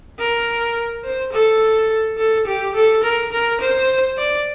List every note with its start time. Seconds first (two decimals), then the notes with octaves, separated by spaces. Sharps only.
0.19 A#4
1.05 C5
1.33 A4
2.18 A4
2.47 G4
2.75 A4
3.04 A#4
3.32 A#4
3.61 C5
4.17 D5